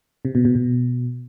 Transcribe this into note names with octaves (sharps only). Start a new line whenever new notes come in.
C3
B2
B2
B2